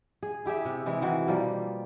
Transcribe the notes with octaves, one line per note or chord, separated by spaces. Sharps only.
G#4
E4 G4 G#4 E5
C3
C3 E3 G#3 E4
D#3 E3 F#4
B2 F3 G3 A#3